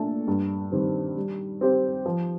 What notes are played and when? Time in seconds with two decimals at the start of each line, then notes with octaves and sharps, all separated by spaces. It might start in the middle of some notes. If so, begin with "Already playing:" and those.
Already playing: A#2 A3 D4 A4
0.28 G2
0.72 D#3 G3 C4 G4
1.17 G3
1.61 C4 G4 C5
2.06 F3